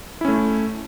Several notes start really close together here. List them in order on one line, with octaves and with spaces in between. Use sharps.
E4 C#4 A3